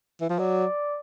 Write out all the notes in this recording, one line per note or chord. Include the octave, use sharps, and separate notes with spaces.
E3
F3
F#3 D5